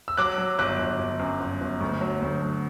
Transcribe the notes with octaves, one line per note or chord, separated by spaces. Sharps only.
E6
F#3 D6 F#6
F#3
G1 D6 F#6
G1
G1
F#2
G1
G1
D2
F#3
D2
F#3